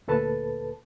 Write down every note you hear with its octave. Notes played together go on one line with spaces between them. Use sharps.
D2 A#2 A4 B4 A5